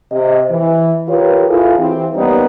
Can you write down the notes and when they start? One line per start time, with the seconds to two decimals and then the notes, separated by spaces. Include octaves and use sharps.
0.11 C3 D#5
0.50 E3
1.09 F4 G4 A#4 B4 C#5
1.49 E4 F4 G#4 A4
1.78 E3 C4 G4
2.15 G3 A#3 B3 C#4 D#4